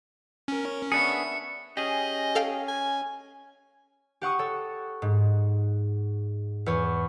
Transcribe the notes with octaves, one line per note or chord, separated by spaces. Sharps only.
C#4 A#4
B3 D4 G#4 E5 C#6 C#7
C#4 G4 G#4 D#5
A4 F5 G5
G#5
G4 F#5 C#6 D#6
A4 C#5
G#2
E2 C#5